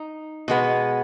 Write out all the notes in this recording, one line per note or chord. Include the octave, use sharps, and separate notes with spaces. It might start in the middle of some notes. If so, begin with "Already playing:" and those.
Already playing: D#4
B2 G#3 B3